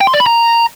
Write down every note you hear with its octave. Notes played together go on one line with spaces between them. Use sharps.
G5
C6
D5
B5
A#5